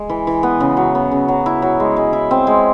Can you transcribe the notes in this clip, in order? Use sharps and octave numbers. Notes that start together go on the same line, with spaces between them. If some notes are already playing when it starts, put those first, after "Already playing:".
Already playing: G#3
E3
E3
B3
C#3
F#3
B3
C#3
F#3
E4
F#3
G#3
G#3
E4
C4
G#3